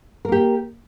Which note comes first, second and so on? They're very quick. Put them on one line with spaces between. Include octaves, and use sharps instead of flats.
A#4 A#3 G4